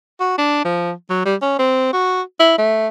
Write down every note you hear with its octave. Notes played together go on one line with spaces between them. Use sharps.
F#4
D4
F3
F#3
G3
C#4
C4
F#4
E4
A3